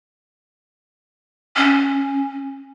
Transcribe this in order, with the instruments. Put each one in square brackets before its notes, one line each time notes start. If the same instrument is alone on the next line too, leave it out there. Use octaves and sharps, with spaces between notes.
[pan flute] C#4